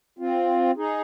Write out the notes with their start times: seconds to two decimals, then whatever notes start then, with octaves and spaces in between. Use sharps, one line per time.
0.19 C4 F4
0.77 D#4 G#4